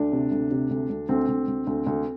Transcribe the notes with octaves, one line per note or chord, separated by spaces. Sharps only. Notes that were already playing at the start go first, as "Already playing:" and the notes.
Already playing: D2 D4
C3
D2
C3
D2
D2
D2 C4
D2
D2
D2
D2